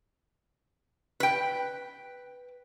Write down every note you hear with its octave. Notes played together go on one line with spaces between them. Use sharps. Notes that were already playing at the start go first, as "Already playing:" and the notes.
B4 G5